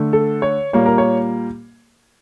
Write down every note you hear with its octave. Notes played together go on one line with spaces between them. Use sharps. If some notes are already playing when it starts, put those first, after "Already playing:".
Already playing: D3 A3
A4
C#5
A#2 G3 A#3 C#5
A#4
C#5